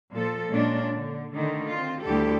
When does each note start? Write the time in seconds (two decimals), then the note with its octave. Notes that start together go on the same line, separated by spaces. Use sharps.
0.11 A#2 F3 A4
0.52 A#2 G#3 C#4 D4
0.92 D3
1.33 D3 D#3 A3
1.68 C4 F4
2.03 D2 G3 E4 G4 A4